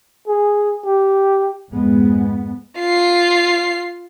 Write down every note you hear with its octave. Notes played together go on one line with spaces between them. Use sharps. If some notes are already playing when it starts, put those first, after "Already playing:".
G#4
G4
F2 G#2 G#3 B3
F4 C7